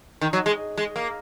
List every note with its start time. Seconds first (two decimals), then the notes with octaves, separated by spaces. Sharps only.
0.21 D#3
0.33 F#3
0.46 G#3
0.78 G#3
0.96 A#3